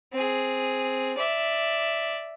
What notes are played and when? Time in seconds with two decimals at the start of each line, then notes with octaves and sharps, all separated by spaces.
0.13 C4 G#4
1.16 D5 E5